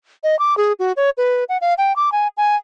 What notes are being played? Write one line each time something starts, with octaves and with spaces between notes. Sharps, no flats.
D#5
D6
G#4
F#4
C#5
B4
F#5
F5
G5
D6
G#5
G#5